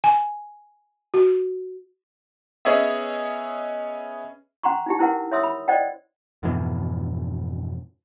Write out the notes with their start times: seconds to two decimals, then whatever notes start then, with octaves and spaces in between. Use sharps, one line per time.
0.04 G#5
1.14 F#4
2.65 B3 C#4 G#4 C#5 D#5 E5
4.63 C#4 F#5 A#5 C6 C#6
4.86 D#4 E4 G4
4.99 C#4 E4 A#4 B4 F#5
5.31 C#5 E5 C6 D#6 E6
5.43 B5
5.68 C5 D5 D#5 F#5 G5
6.43 F2 G#2 B2 E3